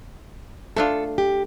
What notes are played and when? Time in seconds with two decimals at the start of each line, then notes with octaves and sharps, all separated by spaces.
0.76 A3 D4 F4 A4
1.18 G4